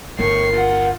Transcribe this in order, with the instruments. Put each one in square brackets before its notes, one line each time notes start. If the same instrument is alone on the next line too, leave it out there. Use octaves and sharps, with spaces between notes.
[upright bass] G1 [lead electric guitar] A2 [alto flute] A#4 [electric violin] C#6 C7
[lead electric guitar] D#2 F#5 [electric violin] F4